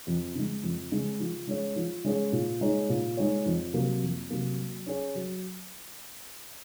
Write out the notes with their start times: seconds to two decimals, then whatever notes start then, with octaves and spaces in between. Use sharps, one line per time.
0.07 F2
0.35 C#3 G#3
0.63 F2
0.92 C#3 G#3
1.20 F3
1.47 G#3 C#4 G#4 C#5
1.76 F3
2.05 G#3 C#4 G#4 C#5
2.33 A#2
2.61 G#3 D#4 G#4 C#5
2.89 A#2
3.17 G#3 D#4 G#4 C#5
3.46 F2
3.74 C3 F#3 A#3
4.02 F2
4.30 C3 F#3 A#3
4.58 F#3
4.86 C#4 G#4 C#5
5.15 F#3